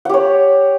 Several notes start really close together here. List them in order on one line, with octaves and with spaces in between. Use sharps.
F#5 G4 C#5